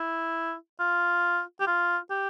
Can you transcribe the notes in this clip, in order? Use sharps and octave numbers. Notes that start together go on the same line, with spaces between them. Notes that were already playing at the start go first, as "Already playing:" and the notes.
Already playing: E4
F4
G4
F4
G4